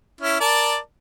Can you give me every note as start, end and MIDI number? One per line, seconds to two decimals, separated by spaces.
0.21 0.40 61
0.21 0.40 64
0.40 0.78 70
0.40 0.78 74
0.40 0.78 81